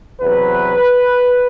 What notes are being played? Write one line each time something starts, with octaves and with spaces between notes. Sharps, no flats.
E2 C3 F#3 B4